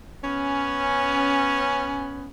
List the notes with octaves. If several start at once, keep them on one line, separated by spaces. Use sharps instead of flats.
B3 C#4